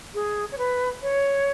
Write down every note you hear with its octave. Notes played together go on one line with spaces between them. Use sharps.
G#4
C#5
B4
C#5